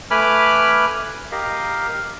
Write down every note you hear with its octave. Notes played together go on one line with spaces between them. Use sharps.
A3 B4 G#5 B5 D6 F6
G4 A#4 D#5 F5